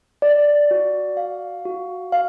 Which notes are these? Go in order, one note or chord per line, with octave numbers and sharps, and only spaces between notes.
D5
F#4
F5
F#4
F5